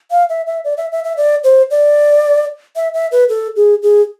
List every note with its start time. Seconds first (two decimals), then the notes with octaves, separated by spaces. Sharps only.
0.11 F5
0.30 E5
0.47 E5
0.64 D5
0.77 E5
0.92 E5
1.04 E5
1.17 D5
1.44 C5
1.71 D5
2.76 E5
2.94 E5
3.12 B4
3.29 A4
3.56 G#4
3.83 G#4